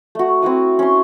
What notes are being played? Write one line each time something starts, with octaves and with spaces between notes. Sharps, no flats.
A3 F#4
C4 E4 F#4 D#6
C#4 C6